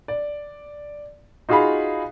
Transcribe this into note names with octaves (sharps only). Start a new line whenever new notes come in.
D5
D#4 F4 F#4 G#4 F5 B5